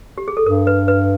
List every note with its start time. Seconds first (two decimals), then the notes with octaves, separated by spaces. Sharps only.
0.18 G4
0.28 G#4
0.37 A4
0.46 G2 A#4
0.67 B4
0.88 B4